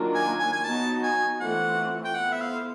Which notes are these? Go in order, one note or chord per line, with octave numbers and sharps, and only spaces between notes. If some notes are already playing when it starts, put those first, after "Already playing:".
Already playing: D#3 F#3 A#3 D4 F4
G#5
G#5
G#5
F#3 B3 D#4 F#4 A5
G#5
E3 A3 C4 F4 F#5
G5
B3 E4 A4 C5 F#5
E5
F5